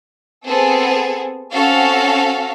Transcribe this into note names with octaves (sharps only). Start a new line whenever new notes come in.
B3 C4 G#4 A4
C4 C#4 F#4 A4 F5